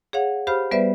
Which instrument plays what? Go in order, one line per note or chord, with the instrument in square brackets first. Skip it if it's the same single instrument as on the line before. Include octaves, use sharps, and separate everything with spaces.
[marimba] G#4 C#5 F5 F#5
G4 C5 F5 B5 F6
G3 B3 B4 C5 D5 E5